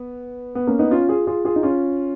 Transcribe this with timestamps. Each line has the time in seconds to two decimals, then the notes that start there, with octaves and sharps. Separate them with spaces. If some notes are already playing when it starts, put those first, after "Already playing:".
Already playing: B3
0.55 B3
0.67 A#3 C#4
0.79 B3 D#4
0.91 C#4 F4
1.09 F4 G#4
1.27 F4 G#4
1.45 F4 G#4
1.56 D#4
1.63 C#4 F4